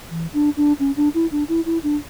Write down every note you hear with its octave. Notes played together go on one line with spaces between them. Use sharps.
E3
D4
D4
C#4
D4
E4
D4
E4
E4
D4